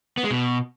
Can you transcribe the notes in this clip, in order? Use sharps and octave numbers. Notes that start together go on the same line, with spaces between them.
B3
G#3
B2